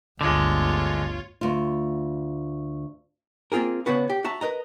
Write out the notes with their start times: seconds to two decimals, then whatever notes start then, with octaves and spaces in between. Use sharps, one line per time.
0.21 G1 D2 D3 G#3 F4 C#5
1.41 D2 F4
3.52 A#3 C4 F4 G#4 A#4
3.86 C#3 B3 D4 F#4 B4
4.10 G4
4.24 F#4 E5 A5 A#5
4.41 A#4 B4 D#5 A#5